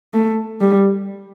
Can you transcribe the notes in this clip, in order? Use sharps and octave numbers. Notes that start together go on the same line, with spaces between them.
A3
G3